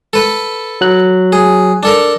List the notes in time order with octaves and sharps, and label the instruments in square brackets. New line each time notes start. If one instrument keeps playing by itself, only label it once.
[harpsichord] A4 B4
[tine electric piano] F#3 F#6
[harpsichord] G#4
D4 A4 A#4